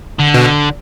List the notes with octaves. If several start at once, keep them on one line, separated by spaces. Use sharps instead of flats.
D3
B2